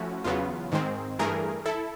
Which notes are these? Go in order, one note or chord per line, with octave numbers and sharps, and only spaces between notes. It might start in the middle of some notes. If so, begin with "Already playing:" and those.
Already playing: F3 A3 C#4 E4 F#4
E2 C#3 F#3 B3 F4
G#2 D#3 G#3 C4
G2 E3 A3 G#4 A#4
E4 A4